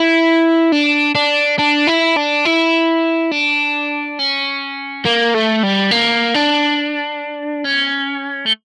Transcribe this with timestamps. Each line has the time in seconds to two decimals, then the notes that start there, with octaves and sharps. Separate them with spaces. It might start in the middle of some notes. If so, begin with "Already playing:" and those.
Already playing: E4
0.72 D4
1.15 D4
1.59 D4
1.88 E4
2.17 D4
2.45 E4
3.31 D4
4.19 C#4
5.05 A#3
5.34 A3
5.63 G3
5.91 A#3
6.34 D4
7.65 C#4
8.46 A3